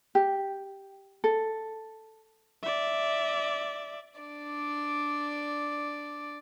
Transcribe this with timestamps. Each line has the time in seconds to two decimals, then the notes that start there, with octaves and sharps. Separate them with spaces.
0.15 G4
1.24 A4
2.63 D5 E5
4.20 D4 D5